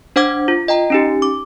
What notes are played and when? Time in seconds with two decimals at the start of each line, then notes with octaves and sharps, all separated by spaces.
0.16 D4 C5 F#5 D6 G#6
0.48 F4
0.68 D#5 G5 A#5
0.90 C#4 D#4 G4
1.22 D6